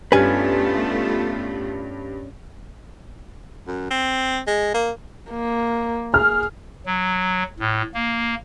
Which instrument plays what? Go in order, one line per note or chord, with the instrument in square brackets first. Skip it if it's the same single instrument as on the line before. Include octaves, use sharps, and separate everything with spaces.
[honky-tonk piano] G2 [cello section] A3 B3 F4 [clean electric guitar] C#4 D4 [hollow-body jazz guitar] B4 G#5
[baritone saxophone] F#2
C4
G#3
A#3
[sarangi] A#3
[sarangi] G#4 [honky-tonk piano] F6
[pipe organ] F#3
A2
A#3